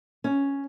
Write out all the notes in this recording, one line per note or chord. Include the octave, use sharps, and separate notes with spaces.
C#4